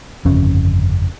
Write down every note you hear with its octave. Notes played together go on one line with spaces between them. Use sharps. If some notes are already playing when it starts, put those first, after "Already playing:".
G1 F2 C#3 C#4